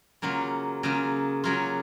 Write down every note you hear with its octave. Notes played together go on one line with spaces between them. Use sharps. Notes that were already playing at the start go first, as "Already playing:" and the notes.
C#3 F#3 A#3 F4
C#3 F#3 A#3 F4
C#3 F#3 A#3 F4